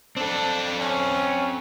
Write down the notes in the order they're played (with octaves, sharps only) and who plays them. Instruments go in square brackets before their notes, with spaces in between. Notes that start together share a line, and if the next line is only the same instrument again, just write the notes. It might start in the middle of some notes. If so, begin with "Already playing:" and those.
[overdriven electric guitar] C4 A4 [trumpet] D4
[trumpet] C#4